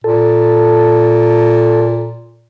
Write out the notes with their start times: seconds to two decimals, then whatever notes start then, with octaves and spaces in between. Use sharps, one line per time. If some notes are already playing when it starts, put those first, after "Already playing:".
0.04 A#2 A4